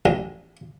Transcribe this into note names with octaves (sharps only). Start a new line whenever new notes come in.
A1